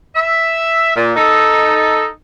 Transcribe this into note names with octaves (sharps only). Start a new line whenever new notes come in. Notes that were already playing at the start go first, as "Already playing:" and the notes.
E5
A#2
D#4 A4